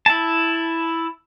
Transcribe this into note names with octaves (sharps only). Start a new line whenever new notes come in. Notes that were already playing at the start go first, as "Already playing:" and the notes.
E4 A5